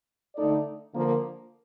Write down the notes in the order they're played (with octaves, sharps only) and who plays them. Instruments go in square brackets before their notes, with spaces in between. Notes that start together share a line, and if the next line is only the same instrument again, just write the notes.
[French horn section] D3 A3 D#4 A4 D5
D3 F3 A#3